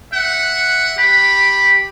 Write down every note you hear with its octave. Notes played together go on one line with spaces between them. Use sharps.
E5 F#5
G4 B5